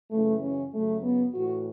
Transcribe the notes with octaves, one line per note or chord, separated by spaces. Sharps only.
F#2 C#3 E3 A3
C#4
F#2 C#3 F#3 A3
B3
A2 E3 F#4